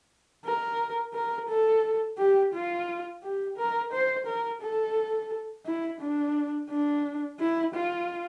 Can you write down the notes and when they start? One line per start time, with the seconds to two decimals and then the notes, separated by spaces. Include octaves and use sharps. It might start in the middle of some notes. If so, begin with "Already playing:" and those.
0.45 A#4
1.14 A#4
1.48 A4
2.18 G4
2.53 F4
3.23 G4
3.57 A#4
3.92 C5
4.26 A#4
4.61 A4
5.65 E4
6.00 D4
6.69 D4
7.39 E4
7.74 F4